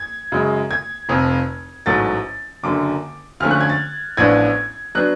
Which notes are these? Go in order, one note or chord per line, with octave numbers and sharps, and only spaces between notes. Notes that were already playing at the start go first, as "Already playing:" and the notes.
Already playing: G#6
F#2 C#3 G#3
G#6
F1 F2 F3
A1 G#2 F#3 A3 A6
F#1 F#2 D3 D6
D2 D3 F3 A3 C#4 F6
F#6
G#6
A6
A1 A2 F3 B3 D4 G#6
F#3 B3 D4 F#6